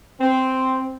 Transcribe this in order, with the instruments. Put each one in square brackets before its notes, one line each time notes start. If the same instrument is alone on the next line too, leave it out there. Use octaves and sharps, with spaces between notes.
[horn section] C4